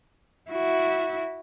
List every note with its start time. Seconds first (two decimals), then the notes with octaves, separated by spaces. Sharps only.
0.51 E4 F#4